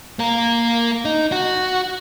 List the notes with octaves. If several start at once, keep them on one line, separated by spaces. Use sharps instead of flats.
A#3 A#4
D#4
F#4